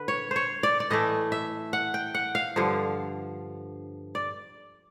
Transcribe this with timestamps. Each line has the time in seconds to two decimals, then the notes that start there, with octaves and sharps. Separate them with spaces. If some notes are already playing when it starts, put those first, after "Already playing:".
Already playing: D3 B4
0.08 C#5
0.31 C5 C#5
0.63 D5
0.80 D5
0.90 A2 E3 A3 D#5
1.32 E5
1.73 F#5
1.94 G5
2.15 F#5
2.35 F5
2.56 G2 D3 F3
4.15 D5